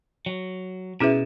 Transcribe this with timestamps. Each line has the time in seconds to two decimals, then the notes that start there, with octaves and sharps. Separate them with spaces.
0.26 F#3
1.00 B2 C#4 E4 G#4 B4 E5